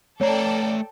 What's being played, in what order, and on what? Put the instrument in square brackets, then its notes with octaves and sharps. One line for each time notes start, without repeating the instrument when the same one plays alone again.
[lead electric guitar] A3 A#5 [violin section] A4 D5 G5 [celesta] C#5